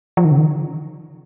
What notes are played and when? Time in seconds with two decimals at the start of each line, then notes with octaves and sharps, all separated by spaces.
0.17 F3
0.25 D#3
0.31 C#3
0.38 D#3